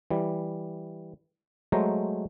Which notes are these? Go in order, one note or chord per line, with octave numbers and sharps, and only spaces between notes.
E3 G3
F#3 G#3 A3 C5 A#5